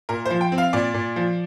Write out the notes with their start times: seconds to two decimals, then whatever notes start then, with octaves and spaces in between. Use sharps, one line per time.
0.09 A#2 A#4
0.25 F3 C5
0.41 G5
0.52 C4
0.58 F5
0.73 A#2 D5
0.94 A#2
1.16 F3